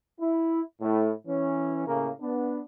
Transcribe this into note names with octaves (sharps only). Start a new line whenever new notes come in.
E4
A2
E3 C#4
A2 C#3 A#3
B3 D4